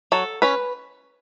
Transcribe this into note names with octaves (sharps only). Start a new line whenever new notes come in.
F#3 A4
C#4 B4